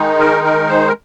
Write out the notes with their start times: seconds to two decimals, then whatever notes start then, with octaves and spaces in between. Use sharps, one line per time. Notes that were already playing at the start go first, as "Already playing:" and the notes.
Already playing: D#3 G#3 D#4
0.19 A#4
0.44 A#4
0.68 C5
0.88 A#4